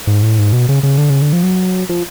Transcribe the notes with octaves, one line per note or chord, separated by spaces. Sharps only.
G#2
A2
G#2
B2
C#3
C#3
D3
C#3
D3
F3
F#3
F3